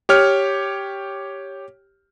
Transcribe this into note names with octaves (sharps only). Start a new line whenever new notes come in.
G4 C#5 F6